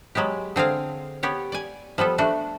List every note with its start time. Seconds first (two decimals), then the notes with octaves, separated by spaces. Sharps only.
0.15 F#3 G#3 B3 G4
0.56 D3 C4 G#4 F5
1.23 B3 G4 C#5
1.52 D5 G#5
1.98 F3 G3 B3 A4
2.18 A3 D4 F#4